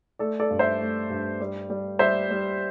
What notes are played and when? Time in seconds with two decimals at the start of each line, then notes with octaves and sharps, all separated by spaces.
0.19 A3 A4 D5
0.40 A4 D5
0.51 G2
0.59 C5 E5
0.81 A3
1.10 G2
1.40 G3
1.70 G3
1.99 G3 C5 E5
2.31 G3